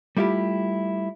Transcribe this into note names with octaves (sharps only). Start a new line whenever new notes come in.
G3 A3 E4 F4 G4